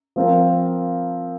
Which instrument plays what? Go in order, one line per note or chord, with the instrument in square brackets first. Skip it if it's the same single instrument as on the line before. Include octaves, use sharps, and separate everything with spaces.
[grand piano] F3 C4 F4 A#4